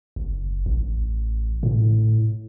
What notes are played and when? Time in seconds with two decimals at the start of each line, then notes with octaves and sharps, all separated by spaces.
0.16 F#1
0.66 A1
1.63 A2